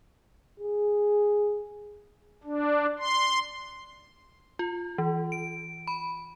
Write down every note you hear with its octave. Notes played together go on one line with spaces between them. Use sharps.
G#4
D4
C6
F4
E3
D7
B5